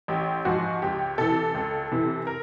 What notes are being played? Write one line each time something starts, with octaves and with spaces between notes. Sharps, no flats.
A1 G4
G#2 F3 F#4
C#2 G4
C3 E3 A4
C#2
C3 E3
A#4